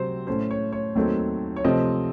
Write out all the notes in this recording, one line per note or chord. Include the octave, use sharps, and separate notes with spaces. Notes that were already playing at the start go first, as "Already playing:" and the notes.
Already playing: C3 F#3 C4 C5
A2 A3 C#4 C5
C#5
C#5
D#2 D#3 F#3 A3 C4
C#5
C3 F3 A3 C4 D#5